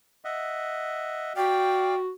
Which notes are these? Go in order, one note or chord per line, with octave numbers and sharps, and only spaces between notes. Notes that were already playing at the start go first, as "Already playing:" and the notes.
D#5 E5 F#5
F#4 D5 F5 G5